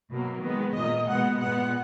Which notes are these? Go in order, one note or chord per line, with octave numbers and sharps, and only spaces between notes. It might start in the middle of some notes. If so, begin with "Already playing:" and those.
B2 F#3 A#3
D#3 G#3 B3
A#2 A#3 D#5
B2 G#3 B3 F#5
A#2 G#3 B3 F#5